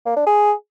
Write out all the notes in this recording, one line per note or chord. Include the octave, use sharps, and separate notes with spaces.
A#3
D4
G#4